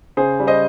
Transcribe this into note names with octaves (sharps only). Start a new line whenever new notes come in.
C#3 G#4 C5
G3
C5 D#5